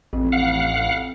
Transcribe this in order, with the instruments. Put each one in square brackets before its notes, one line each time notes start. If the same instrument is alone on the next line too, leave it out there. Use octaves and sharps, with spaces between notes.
[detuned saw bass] A1 [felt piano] F2
[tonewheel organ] F5 F#5